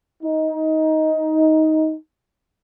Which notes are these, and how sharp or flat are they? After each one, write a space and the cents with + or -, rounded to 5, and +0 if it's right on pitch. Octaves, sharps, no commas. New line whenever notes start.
D#4 +15